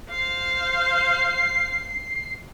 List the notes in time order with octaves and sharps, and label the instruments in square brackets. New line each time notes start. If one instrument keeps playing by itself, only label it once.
[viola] C5 F5 [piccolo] C7